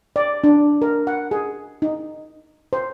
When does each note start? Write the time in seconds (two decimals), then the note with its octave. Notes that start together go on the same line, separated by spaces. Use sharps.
0.16 D5
0.44 D4
0.82 A#4
1.07 F#5
1.31 G#4
1.82 D#4
2.73 C5